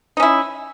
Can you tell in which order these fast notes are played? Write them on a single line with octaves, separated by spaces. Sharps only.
D#4 C#4 E4